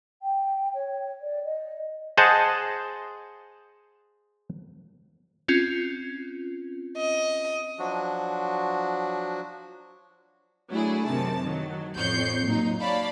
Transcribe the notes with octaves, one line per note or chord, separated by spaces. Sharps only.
G5
C#5
D5
D#5
G#4 C5 D#5 F#5 A5
C4 C#4 F4
D#5
F3 F#3 D4 F#4
F#3 A3 D4 E4 G#4
F#2 C3 D#3 A5
D#3 F#3
A1 F2 C#5 G6 C7 C#7
A#2 F#3 D#4
C#5 D5 F5 A5 B5